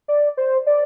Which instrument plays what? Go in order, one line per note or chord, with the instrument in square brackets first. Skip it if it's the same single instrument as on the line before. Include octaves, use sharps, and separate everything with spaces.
[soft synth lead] D5
C5
D5